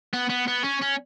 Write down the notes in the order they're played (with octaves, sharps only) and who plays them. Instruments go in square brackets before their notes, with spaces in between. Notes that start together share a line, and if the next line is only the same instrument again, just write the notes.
[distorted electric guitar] B3
B3
B3
C#4
C#4